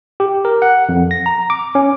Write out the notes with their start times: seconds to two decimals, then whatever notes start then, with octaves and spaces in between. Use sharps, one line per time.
0.20 G4
0.45 A#4
0.62 F#5
0.89 F2
1.11 A#6
1.26 A#5
1.50 D6
1.75 C#4